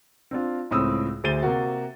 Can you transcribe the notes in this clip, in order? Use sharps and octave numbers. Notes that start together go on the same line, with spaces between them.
C4 D4 F4
C#2 A2 C4 D#6 E6
D2 G#4 C5 A6 D#7 G7
C3 A#3 F#4